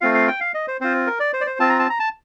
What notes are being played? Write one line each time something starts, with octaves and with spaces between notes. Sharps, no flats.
A3 C4 F4 F5
F5
G5
F5
D#5
C5
C4 F4 C5
A#4
D5
C5
D5
C5
C4 F4 A5
A#5
A5
A#5
A5